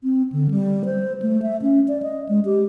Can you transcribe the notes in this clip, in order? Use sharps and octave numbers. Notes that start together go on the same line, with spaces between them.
C4
D3
G3
C5
A3
E5
C#4
D5
D#5
G#3
G4